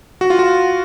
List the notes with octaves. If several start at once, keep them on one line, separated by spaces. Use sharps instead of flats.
F#4
F4
F#4